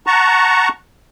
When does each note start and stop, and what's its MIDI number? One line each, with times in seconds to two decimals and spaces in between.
0.07 0.68 78
0.07 0.68 81
0.07 0.68 82
0.07 0.68 85